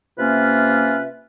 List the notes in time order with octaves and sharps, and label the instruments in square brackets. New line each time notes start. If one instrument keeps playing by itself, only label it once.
[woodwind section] C3 A#3 C#4 F4 B4 E5